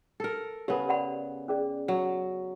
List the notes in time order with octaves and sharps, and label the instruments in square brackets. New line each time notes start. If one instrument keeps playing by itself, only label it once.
[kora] A4 A#4
[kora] C#3 B3 [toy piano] G4 A#4
[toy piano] D5 F#5 B5
C#4 G#4 D5
[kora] F#3